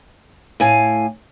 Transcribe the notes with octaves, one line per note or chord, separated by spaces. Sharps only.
A2 F5 G#5